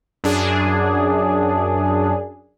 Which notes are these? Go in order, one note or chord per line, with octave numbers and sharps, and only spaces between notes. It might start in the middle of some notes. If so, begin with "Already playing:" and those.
F#2 D4 G#4